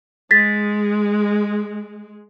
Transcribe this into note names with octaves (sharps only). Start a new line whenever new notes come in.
G#3 A6 B6